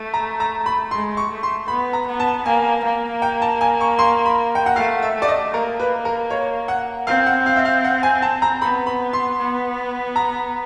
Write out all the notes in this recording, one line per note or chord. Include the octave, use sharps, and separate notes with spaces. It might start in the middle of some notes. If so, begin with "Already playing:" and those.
Already playing: A3
A#5
A#5
B5
G#3 C6
C#6
A3
C6
B3 B5
A#5
B3
A5
A#3 G#5
A#3
G5
A5
G#5
C#6
C6
B5
G5
F#5
A3 F5
E5
A3
D5
D#5
A#3 A#4
B4
A#4
C#5
F#5
C4 F5
F#5
F5
E5
F5
F#5
G#5
A5
A#5
B3 B5
B5
C6
B3
A#5